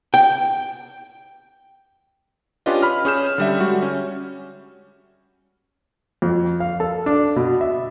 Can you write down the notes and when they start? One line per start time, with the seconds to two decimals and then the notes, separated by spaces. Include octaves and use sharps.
0.14 G5
2.66 C#4 D4 F4 G4 B4 D#5
2.82 B5 F6
3.05 C#4 G#4 G6 E7
3.38 D3 G3 E5
3.60 G3 G#3 F#4
3.82 C#4
6.22 F2
6.60 F5
6.80 A4
7.06 D4
7.36 B2
7.61 E5